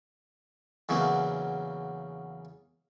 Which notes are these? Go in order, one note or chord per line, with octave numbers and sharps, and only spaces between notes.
E2 C#3 F#3 A#3